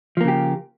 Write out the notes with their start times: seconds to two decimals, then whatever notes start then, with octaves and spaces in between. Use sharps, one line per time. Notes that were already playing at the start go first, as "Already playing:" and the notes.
0.17 F3
0.21 A#3
0.24 C#3
0.28 G4